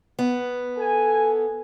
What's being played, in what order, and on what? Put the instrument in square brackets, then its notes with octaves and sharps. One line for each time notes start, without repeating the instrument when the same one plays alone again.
[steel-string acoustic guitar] B3
[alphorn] A4 [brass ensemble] G#5